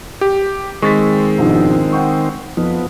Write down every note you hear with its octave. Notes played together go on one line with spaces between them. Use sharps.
G4
D#3 G#3 C4 C#6 A6 B6
A#1 G#2 B2
F#5 G5 C#6
F2 F3 B3